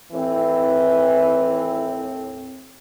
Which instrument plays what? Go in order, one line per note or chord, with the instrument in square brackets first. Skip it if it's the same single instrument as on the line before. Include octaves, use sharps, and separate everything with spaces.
[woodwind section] D#2 A2 C4 [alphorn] E3